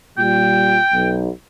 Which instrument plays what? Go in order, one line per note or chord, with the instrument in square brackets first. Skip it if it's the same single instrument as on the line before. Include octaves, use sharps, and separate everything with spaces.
[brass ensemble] A#2 G3 F4 [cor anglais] G5
[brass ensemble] B1